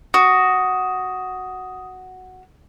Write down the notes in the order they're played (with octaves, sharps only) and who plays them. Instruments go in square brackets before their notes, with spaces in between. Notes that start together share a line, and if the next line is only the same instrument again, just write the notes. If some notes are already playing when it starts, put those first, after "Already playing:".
[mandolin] F#4 [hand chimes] D#6